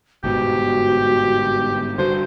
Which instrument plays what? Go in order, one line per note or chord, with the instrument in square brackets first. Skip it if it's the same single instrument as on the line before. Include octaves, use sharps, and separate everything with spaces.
[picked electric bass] G1 G#2 B2 [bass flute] F#4 [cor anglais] G4
[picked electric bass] G2 D3 [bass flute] F#4 [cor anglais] C5